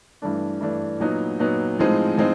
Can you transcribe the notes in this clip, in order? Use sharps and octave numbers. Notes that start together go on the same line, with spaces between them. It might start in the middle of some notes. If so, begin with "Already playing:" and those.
G2 E3 A3 D4
G2 E3 A3 D4
A#2 F#3 B3 D#4
A#2 F#3 B3 D#4
A2 F3 G#3 C4 D#4
A2 F3 G#3 C4 D#4